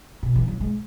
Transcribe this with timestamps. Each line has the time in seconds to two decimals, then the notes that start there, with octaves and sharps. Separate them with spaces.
0.23 B2
0.35 E3
0.48 F#3
0.60 G#3